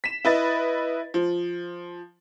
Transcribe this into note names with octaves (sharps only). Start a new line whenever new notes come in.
B6 E7
E4 B4 D#5 A6
F3